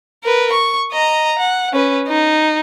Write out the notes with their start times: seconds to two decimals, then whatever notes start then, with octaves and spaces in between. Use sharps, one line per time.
0.23 A#4 B4
0.53 C#6
0.92 D#5 A#5
1.38 F#5
1.73 C#4 B4
2.08 D#4